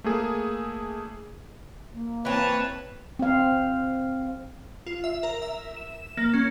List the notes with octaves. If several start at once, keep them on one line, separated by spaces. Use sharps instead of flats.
A3 A#3 G#4
A#3
E3 C4 B4 C#5 A5
C4 F5
F4
E5
A#4
E5
E7
A#3
C#4